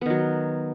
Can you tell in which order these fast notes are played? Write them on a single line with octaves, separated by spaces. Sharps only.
B3 D#3 F#3